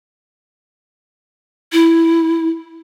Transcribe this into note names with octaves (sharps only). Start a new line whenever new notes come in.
E4